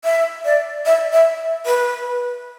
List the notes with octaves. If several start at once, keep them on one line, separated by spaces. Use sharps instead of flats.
E5
D5
E5
E5
B4